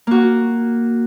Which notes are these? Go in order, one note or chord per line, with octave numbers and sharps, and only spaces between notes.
A#3 F#4